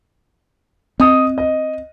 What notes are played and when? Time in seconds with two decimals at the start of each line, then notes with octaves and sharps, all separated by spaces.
1.00 C4 D#5 D#6
1.38 D#5